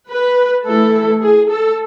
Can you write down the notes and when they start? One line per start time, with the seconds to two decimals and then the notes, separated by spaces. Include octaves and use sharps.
0.09 B4
0.66 E3 A3 E4 A4
1.22 G#4
1.50 A4